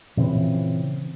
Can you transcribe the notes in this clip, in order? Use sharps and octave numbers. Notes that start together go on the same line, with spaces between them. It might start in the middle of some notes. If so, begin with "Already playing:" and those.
A#2 C#3 E3 C4